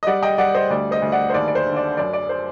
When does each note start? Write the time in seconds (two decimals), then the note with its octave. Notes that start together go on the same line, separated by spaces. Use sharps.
0.03 D#5
0.07 G3 D5 F#5
0.23 D#5 G5
0.38 G3 D5 F#5
0.54 C5 D#5
0.70 D2 D5
0.91 C5 D#5
1.02 D2
1.12 D5 F#5
1.30 C5
1.34 D#2 D5
1.48 D5
1.55 C5
1.66 D3
1.76 D5
1.97 F#2 D5
2.13 D5
2.29 C5